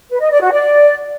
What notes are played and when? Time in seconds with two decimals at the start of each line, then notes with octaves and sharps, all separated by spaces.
0.11 B4
0.21 D#5
0.31 D5
0.41 F#4
0.52 D5